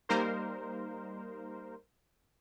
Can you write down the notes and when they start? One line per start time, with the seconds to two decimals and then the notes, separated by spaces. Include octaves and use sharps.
0.09 G3 A#3 D#4 A#4 C5